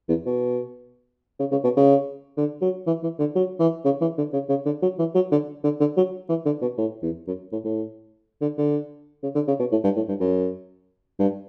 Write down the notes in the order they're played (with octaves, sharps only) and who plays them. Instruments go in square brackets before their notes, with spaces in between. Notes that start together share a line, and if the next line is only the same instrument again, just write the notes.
[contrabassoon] E2
B2
C#3
C#3
B2
C#3
D3
F#3
E3
E3
D3
F#3
E3
C#3
E3
D3
C#3
C#3
D3
F#3
E3
F#3
D3
D3
D3
F#3
E3
D3
B2
A2
E2
F#2
A2
A2
D3
D3
C#3
D3
C#3
B2
A2
G2
A2
G2
F#2
G2